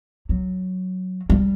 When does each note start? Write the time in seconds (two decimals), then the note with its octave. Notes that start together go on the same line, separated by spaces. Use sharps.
0.29 F#3
1.30 G3